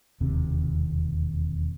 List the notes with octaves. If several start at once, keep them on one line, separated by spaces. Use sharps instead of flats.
E1 D#2 C3 C4